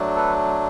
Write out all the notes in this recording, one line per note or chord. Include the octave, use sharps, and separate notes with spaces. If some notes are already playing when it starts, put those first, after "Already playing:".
Already playing: F#3 A3 D4
A4 B4